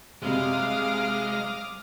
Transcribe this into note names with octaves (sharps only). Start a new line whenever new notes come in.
F#2 C3 G3 G#3 F5 D6 D#6 F6